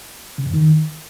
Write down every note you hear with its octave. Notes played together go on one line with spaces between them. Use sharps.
C#3
F2
D#3